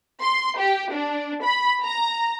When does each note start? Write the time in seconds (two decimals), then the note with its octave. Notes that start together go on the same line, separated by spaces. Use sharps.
0.21 C6
0.58 G4
0.92 D4
1.43 B5
1.83 A#5